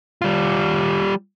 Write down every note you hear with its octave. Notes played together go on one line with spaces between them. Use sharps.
G3 F4